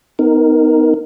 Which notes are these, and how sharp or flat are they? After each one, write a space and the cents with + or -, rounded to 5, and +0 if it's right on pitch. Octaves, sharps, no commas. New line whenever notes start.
B3 +25 D#4 +5 A#4 +0